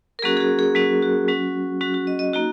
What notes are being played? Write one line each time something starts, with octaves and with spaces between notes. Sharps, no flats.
A#4
F#3 A#3 C#4 F#4 G#4
G#4
F#4
G#4
F#3 A#3 C#4 F#4
F#4
F#3 C#4 F#4
F#3 C#4 F#4
F#4
D#5
D#5
A#3 D#4 F#4